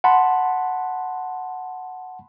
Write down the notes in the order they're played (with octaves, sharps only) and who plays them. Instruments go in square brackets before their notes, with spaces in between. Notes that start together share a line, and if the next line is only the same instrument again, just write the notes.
[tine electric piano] F#5 A5 B5 C6